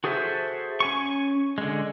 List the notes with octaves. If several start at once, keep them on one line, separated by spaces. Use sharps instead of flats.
F#4 G#4 A4 C5 E5
C#4 G#5 C#6
D3 G#3